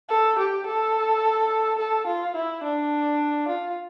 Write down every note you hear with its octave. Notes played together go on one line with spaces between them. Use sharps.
A4
G4
A4
A4
F4
E4
D4
F4